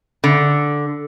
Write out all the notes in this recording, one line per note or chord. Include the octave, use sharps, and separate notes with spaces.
D3